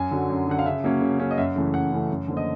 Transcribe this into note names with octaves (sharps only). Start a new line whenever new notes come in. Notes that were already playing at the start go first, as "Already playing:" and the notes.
Already playing: F#2 G#5
D3 F#3
F#2
D3 F#3 F#5
F5
C#3 E5
F#3 A#3 C#4
C#3
F#3 A#3 C#4
D#5
F#2 E5
C#3 E3 A3
F#2 F#5
C#3 E3 A3
F#2
D3 F3 A#3
D#5